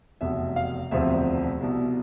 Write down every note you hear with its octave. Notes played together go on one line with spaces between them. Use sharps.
F1 E2 B2 E5
F5
E1 D2 C3 F3 E5
C2 B2